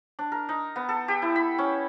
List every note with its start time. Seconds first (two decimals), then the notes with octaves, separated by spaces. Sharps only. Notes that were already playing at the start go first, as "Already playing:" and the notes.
0.19 D4
0.32 A#4
0.49 D#4
0.76 B3
0.89 A4
1.08 G4
1.22 E4
1.36 B5
1.58 C#4